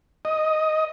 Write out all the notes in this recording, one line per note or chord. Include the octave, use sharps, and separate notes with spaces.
D#5